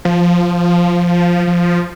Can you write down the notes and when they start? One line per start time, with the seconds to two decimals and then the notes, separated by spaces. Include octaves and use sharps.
0.05 F3
1.47 F3